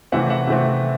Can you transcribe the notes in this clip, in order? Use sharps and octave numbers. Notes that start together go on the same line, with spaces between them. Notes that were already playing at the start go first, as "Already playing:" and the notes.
C3 E3 A3 C4 E5 F#5
E5 F#5
C3 E3 A3 C4